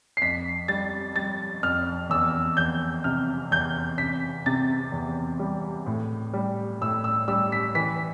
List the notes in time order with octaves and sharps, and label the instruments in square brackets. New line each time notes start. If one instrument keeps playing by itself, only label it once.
[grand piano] C7
F2 B6
G3 A6
G3 A6
F2 F6
E2 E6
E2 G6
C3 F6
E2 G6
C3 B6
C3 A6
E2
G3
A2
G3
A2 E6
E6
G3 E6
B6
E3 B6